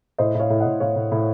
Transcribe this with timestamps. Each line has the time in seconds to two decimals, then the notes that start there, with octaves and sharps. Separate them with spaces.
0.18 A2 C5 D#5
0.35 A2 C#5 F5
0.50 A2
0.60 D#5 F#5
0.66 A2
0.80 A2 C#5 F5
0.96 A2
1.12 A2